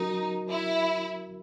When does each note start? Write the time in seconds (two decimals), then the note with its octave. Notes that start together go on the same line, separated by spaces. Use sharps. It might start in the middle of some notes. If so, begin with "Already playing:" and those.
Already playing: F#3 C#4 D#4 F#4 A#4
0.50 E4